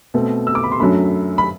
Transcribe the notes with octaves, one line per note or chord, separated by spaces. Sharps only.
B2 A3 C4
E6
D6
B5
C6
F#2 F#3 A3 D4 B5
B5